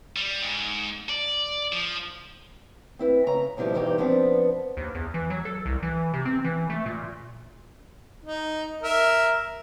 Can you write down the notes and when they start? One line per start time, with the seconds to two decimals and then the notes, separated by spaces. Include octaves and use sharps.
0.16 G3
0.42 G#2
1.09 D5
1.72 F3
2.99 C4 E4 B4
3.27 C#3 A#5
3.57 G2 B2 F3 G3 E4
3.74 E2 G2 E3 D#4 G4
3.98 F3 B3 C4 D4
4.77 D#2
4.95 E2
5.14 E3
5.30 F#3
5.45 A4
5.66 C2
5.83 E3
6.14 C3
6.25 C4
6.44 E3
6.70 A3
6.86 A#2
8.25 D#4
8.83 A#4 E5